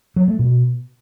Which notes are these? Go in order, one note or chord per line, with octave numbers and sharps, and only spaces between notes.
F#3
A3
B2